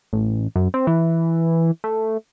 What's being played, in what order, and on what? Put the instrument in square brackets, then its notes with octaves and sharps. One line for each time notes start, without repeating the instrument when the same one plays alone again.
[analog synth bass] A1
F#2
C4
E3
A3